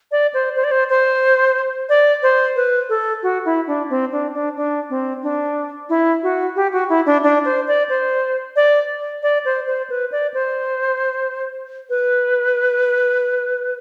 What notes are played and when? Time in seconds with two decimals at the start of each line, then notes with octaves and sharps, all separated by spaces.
0.12 D5
0.34 C5
0.56 C5
0.64 D5
0.71 C5
0.90 C5
1.89 D5
2.23 C5
2.56 B4
2.89 A4
3.23 F#4
3.45 E4
3.67 D4
3.90 C4
4.12 D4
4.34 D4
4.56 D4
4.90 C4
5.23 D4
5.89 E4
6.23 F#4
6.56 G4
6.73 F#4
6.89 E4
7.06 D4
7.23 D4
7.45 C5
7.68 D5
7.89 C5
8.56 D5
9.23 D5
9.45 C5
9.67 C5
9.90 B4
10.12 D5
10.34 C5
11.90 B4